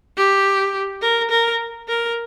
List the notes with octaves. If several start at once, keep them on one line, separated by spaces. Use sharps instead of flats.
G4
A#4
A#4
A#4